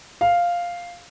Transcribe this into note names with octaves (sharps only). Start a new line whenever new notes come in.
F5